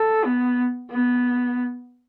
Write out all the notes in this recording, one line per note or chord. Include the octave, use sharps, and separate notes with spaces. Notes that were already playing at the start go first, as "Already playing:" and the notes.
Already playing: A4
B3
B3